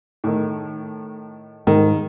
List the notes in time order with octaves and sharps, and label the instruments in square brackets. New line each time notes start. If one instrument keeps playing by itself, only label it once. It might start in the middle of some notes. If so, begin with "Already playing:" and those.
[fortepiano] A2 D#3
[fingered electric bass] G#2 [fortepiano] D#3